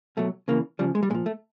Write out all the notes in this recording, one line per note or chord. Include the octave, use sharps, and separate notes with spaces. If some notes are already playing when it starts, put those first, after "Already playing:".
B2 F#3 A3
C#3 E3 A#3
C#3 F3 G3
G#3
G3
A#2 F3 G#3
A3